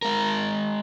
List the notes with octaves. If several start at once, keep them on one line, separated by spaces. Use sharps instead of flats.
G#3 A#4